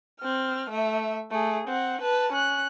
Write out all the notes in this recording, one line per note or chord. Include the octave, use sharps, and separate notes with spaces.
C4 F6
A3 E5
A3 G#4
C4 F#5
B4 A5
C#4 F#6